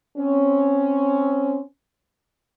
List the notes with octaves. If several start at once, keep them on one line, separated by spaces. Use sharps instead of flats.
C4 C#4